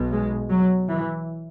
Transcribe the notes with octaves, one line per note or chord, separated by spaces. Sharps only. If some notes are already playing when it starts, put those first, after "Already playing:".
Already playing: B1 B2
G#3
F#3
E3